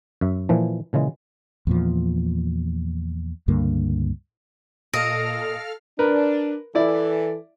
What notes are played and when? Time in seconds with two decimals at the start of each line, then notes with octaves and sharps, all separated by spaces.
0.21 F#2 E5
0.49 A#2 E3 F3
0.93 A#2 C#3 E3 G#3
1.67 E2 A#2 F3
3.48 C#2 G2 D3 A#3
4.93 A#2 A4 D#5 F5 F6 A#6 D7
5.99 D4 A#4 B4
6.75 E3 E4 A4 D5